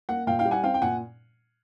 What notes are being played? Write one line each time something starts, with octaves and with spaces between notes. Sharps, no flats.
A#3 F#5
A#2 F5 G5
F5 G5
G3
F#5 G#5
C4 F5 G5
G5
A#2 F#5 G#5